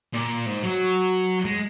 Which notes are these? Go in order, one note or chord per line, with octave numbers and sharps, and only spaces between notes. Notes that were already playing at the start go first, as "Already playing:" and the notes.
A#2
G#2
F#3
G#3